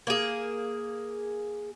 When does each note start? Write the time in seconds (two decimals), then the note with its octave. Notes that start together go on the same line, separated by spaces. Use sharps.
0.07 A#3 G#4